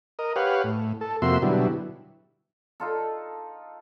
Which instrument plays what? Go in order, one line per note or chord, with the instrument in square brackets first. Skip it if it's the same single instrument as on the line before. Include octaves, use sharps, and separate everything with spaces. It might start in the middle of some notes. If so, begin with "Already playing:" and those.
[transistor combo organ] A#4 D#5
G4 B4 C#5 F5 F#5
A2
A4
F2 C3 A#3 F#4 E5 C6
B2 D3 F#3 G3 E4
[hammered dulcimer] D#4 F4 A4